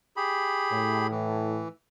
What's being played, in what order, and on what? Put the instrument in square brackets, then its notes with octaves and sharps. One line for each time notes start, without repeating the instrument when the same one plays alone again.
[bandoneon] G4 G#4 B5
[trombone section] A2
[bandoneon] E3